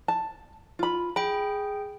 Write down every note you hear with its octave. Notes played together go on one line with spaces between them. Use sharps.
A5
F4 B5
G#4 G5 B5